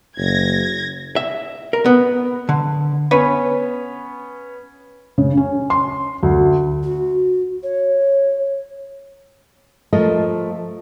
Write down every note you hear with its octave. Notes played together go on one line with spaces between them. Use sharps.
F#1 G#6 A#6
E5
A#4
B3
D3
B3 C#4 B4 C#5
C#3
C#4
C6
D2
F#4
C#5
F3 A3 F4 A#4 D#5